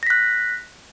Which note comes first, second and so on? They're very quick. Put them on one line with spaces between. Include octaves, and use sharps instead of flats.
A#6 B6 F#6